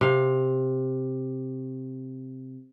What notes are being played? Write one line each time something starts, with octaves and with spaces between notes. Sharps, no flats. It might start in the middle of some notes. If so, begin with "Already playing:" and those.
C3 F5